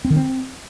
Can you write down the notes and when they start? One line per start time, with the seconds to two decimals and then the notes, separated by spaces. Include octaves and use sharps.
0.05 C4
0.10 D#3
0.16 C4